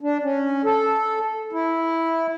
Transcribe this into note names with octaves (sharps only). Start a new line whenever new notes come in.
D4
C#4
A4
E4